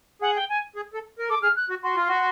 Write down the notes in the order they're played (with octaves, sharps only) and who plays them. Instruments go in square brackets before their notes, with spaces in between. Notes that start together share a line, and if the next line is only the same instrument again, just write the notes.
[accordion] G#4 [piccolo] F#5
[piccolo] G5
G#5
[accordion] G#4
A4
A#4
[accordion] A4 [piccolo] D6
[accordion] G#4 [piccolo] F6
[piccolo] F#6
[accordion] F#4
[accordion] F#4 [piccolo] C6
[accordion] F4
F#4